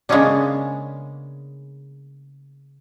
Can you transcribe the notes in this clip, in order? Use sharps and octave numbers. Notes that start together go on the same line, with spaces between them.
C#3 G#3 A#3 B3 C#4 D4